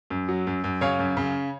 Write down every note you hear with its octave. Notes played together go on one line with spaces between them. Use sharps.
F#2
F#3
F#2
F#2
C#3 C#5 F5
F#2
C#3